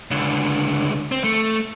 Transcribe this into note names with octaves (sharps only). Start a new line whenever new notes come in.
C#2 D3
C4
A3